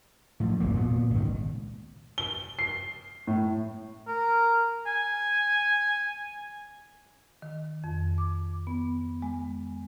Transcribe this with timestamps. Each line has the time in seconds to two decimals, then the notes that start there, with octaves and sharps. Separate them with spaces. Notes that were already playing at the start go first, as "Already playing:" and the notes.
0.40 A2 F3
0.60 D#1 C#2 A#3
0.74 A#2 B3
1.11 G#1 C#2 D#3
2.18 G7
2.59 C7
3.27 A2
4.08 A#4
4.86 G#5
7.42 D#3
7.84 F2
8.18 D6
8.67 B3
9.22 G#3